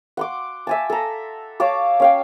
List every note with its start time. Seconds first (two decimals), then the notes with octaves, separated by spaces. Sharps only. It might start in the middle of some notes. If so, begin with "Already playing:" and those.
0.17 F#5 C6 D6
0.67 E5 G#5 A5
0.90 A4 A#5
1.60 C#5 F5 A5 D6
2.00 C#4 F5 G5